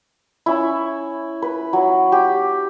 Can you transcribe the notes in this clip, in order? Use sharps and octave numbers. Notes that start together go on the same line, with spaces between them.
C#4 E4
B4
F#3
G4